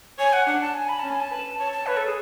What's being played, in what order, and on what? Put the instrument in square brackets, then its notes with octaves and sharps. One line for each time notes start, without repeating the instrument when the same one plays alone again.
[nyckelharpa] C#5 [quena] G#5
[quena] F#5
[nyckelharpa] D4 [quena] F#5
[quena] A5
G#5
B5
[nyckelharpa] C#4 [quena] A5
[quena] G#5
A5
[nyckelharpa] B4
[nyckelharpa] C#5 [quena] A5
[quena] A5
[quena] B4 [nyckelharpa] C#5
[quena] A4
G#4